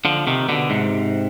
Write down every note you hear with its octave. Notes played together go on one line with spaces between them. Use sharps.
D3 F3
C3 D#3
B2 D3
G#2 C3